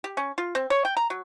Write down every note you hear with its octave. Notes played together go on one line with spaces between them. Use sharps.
G4
C#4
F4
C4
C#5
G5
A#5
F#3